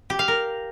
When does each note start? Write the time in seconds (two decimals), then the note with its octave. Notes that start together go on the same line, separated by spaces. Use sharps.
0.10 G4
0.19 F5
0.28 A#4